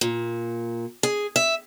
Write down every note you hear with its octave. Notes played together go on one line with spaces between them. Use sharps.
A#2
G#4
E5